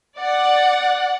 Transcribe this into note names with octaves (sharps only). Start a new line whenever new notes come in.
D5 F#5